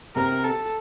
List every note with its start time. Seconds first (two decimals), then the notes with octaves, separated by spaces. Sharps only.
0.16 C3 A#4
0.44 A4